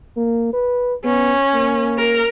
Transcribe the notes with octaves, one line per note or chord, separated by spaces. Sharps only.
A#3
B4
B3 C#4
A#3
A#4